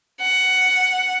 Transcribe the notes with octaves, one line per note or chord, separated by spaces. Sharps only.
F#5